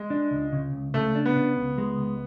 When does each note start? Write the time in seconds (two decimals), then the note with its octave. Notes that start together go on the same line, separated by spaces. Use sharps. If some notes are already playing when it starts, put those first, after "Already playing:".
Already playing: G#3
0.10 D4
0.31 C#2
0.52 C#3
0.73 C#2
0.94 C#3 A3
1.15 D4
1.25 B3
1.36 C#3
1.57 C#2
1.78 G#3
1.99 C#2